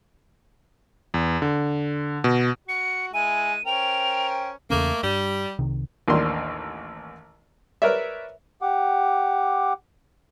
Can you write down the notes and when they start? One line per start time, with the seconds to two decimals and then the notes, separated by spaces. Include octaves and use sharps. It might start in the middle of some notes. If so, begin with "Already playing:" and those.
1.14 E2
1.42 D3
2.24 B2
2.68 F#4 C#7
3.14 G#3 E4 G#5 D#7
3.65 C#4 A#4 C5 G5 F7
4.70 E2 C#3 A3 A#3 C#4
5.03 G2 G3
5.59 C2 C3 D#3
6.08 A1 D#2 A#3 D4 C6
7.82 A#4 B4 C#5 D5 E5
8.62 G4 F#5 D6